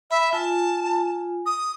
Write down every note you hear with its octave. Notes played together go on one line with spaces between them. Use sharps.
E5 B5
F4 G#5 A5
D#6